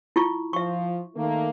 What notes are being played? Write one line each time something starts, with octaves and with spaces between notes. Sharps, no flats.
E4 F4 C#6
F3 E5 C#6
D#3 A3 A#3